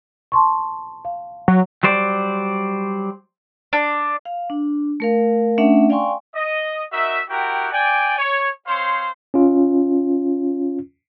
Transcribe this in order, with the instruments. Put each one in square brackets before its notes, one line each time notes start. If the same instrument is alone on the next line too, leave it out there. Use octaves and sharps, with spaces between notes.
[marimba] A5 C6 C#6
F5
[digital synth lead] F#3
[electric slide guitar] F#3 G3 C5 D5
[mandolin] D4
[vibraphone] F5
D4
A3 A#4 F5
A3 C#4 D4 E5 F#5
D5 F5 G5 G#5 C6 C#6
[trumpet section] D#5
D#4 F#4 A#4 E5
E4 F#4 G4 A#4 F#5 G5
D5 G5 G#5
C#5
C4 C5 C#5 F5 C6
[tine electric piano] C#4 F4